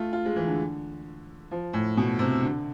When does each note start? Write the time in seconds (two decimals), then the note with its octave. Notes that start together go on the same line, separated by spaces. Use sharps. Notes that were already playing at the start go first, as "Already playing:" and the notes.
Already playing: A3 F4
0.13 F4
0.25 G#3
0.36 E3
0.47 D3
1.51 F3
1.73 A2
1.97 B2
2.19 C3
2.43 D3